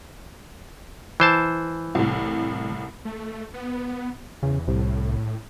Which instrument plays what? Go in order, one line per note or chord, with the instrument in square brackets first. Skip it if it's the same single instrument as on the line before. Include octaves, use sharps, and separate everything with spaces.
[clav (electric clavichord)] E3 C5 A5
[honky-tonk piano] C2 A2
[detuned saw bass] A3
B3
[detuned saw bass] E2 [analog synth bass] C#3
[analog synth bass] C2 [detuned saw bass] A2